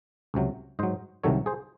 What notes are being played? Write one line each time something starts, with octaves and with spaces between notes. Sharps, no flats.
C#2 C3 F#3
G#2 F#3 C5 D#5
C2 C3 D#3 F#3 A4 C#5
G#4 C5